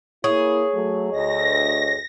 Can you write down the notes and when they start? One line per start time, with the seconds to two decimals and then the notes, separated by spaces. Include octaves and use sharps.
0.24 A#3 E4 G#4 C#5
0.73 F#3 A3
1.12 D2 D#5 A#6